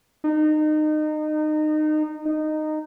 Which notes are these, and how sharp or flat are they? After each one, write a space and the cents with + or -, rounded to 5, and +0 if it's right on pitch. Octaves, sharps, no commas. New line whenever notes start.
D#4 -25
D#4 -15